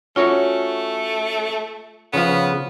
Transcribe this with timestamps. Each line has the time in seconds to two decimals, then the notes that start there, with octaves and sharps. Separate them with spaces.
0.16 A3 C#4 F4 F#4 C#5
2.13 C#3 F3 B3 F5